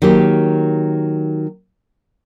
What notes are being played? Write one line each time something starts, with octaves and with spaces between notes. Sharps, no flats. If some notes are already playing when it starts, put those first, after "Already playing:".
D#3 F#3 A#3 G4